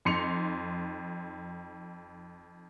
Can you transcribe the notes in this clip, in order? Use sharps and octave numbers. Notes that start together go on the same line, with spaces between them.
F2 D#4 C6 C#7 F7